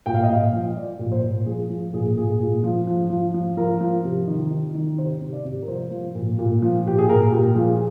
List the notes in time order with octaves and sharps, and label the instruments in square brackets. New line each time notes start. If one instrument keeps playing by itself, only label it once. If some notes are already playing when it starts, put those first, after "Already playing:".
[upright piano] A#2 G5
F5
D#5
A#2 F5
F3
F3 D5
A#2
C5
A#2
F3 G#4
F3
A#2 G#4
A#2 G#4
A#2
F3
F3
F3
F3
F3 A#4
F3
C3
D#3
D#3
D#3
C3 C5
C3
D5
C3
A#4
F3 C5
F3
A#2
A#2
F3
A#2 G4
G#4
A#2 A#4
A#2 G4
F3 G#4